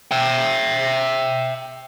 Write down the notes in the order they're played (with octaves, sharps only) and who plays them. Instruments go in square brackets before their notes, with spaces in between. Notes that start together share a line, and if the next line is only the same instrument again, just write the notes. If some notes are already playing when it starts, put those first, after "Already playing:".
[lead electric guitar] E5 G5